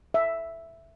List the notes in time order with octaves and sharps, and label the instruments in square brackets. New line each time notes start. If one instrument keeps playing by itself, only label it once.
[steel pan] E5